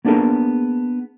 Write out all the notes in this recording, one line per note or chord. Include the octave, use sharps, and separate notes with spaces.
A#3 B3 D4 G#4 A#4